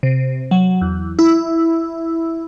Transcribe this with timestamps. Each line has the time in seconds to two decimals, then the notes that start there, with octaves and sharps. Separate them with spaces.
0.03 C3
0.51 F#3
0.81 E2
1.19 E4